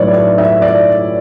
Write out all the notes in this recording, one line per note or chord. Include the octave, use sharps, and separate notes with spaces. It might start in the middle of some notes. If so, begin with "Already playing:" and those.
Already playing: A2 F#3 B4 C#5 D5
D5
E5
D5